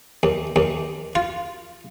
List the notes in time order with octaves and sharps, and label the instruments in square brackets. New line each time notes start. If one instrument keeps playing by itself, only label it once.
[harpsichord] D#2
D#2
F4